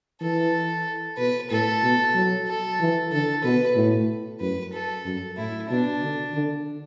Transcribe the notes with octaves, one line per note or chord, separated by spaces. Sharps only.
E3 A4
B2 B4
A2 A4
B2
F#3
A4
E3
D3 A4
B2 B4
A2
F#2 B4
A4
F#2
A2 E4
B2 D4
D3
D3